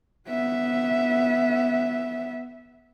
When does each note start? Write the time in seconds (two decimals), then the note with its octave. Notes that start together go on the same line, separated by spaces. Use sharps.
0.29 B3 E5